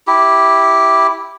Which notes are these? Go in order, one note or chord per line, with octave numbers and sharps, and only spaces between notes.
E4 G4